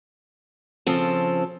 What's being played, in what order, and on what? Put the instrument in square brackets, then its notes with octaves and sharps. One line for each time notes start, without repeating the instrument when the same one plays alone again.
[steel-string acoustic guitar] C#3 F3 C4 A4